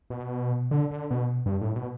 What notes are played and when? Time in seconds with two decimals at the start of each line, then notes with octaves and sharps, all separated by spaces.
0.10 B2
0.71 D3
0.91 D3
1.11 B2
1.46 G2
1.61 A2
1.76 B2